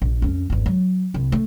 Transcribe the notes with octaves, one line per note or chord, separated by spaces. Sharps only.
A#1
F2 C#4
G#1 E2
F#3
C2
A3